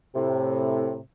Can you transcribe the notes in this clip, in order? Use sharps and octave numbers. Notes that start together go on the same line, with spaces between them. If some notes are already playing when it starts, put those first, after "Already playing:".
A2 C3